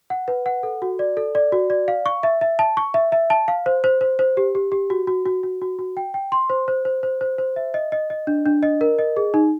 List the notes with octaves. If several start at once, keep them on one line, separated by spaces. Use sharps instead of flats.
F#5
B4
F#5
A4
F#4
D5
A4
D5
F#4
D5
F5
C#6
E5
E5
A5
C#6
E5
E5
A5
F5
C5
C5
C5
C5
G4
G4
G4
F#4
F#4
F#4
F#4
F#4
F#4
G5
G5
C6
C5
C5
C5
C5
C5
C5
E5
D#5
D#5
D#5
D4
D4
D#5
A#4
D#5
G#4
D#4